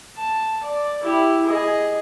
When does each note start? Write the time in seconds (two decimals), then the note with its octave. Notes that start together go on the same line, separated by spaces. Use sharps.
0.17 A5
0.63 D5
1.03 E4 G4
1.46 G#4 D#5